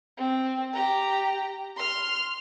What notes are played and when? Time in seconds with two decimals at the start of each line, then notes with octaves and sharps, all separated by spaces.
0.17 C4
0.73 G4 A#5
1.77 C6 F6